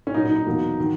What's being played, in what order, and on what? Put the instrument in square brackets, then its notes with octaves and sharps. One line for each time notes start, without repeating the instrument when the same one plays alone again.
[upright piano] C#4
A#2 F#3 A#3 D#4
D#4
D#4
E2 B2 F#3 A#3
D#3 F#3